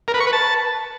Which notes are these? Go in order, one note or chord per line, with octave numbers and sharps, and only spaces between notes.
A#4
B4
C#6
B4
A5